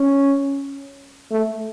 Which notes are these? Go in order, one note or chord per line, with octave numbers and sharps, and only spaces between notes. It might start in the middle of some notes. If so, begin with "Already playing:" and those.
Already playing: C#4
A3